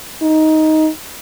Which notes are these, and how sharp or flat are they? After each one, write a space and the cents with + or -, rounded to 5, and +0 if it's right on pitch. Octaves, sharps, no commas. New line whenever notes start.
D#4 +10